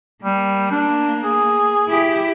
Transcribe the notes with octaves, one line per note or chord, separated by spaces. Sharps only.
G3 A#3
D4
G#4
E4 G4